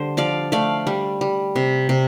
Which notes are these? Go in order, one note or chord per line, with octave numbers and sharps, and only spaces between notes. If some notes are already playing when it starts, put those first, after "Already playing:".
Already playing: D3 G3 C5
F3 D5 F5
A3 D5 F5
G3
G3
C3
C3